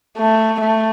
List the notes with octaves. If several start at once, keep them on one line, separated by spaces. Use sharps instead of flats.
A3
A3